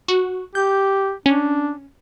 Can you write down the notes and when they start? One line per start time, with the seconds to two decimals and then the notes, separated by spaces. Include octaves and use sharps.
0.08 F#4
0.55 G4 G6
1.26 C#4 D4